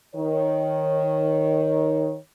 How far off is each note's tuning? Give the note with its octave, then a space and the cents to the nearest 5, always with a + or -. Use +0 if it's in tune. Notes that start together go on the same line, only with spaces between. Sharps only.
D#3 +5 C#5 -15